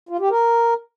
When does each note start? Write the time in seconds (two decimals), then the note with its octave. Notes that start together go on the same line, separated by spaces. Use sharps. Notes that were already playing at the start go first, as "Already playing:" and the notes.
0.09 F4
0.20 G4
0.30 A#4